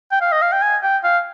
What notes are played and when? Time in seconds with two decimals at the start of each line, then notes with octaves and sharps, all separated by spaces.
0.12 G5
0.21 F5
0.32 D#5
0.42 F5
0.52 G5
0.62 G#5
0.83 G5
1.04 F5